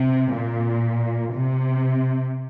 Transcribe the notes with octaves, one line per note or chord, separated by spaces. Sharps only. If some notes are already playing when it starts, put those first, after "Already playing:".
Already playing: C3
A#2
C3